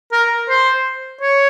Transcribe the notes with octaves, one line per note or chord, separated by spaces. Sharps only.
A#4
C5
C#5